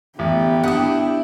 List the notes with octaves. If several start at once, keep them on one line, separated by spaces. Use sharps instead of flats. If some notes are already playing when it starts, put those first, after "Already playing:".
A1 B3 G4
D4 E4 F#5 D#6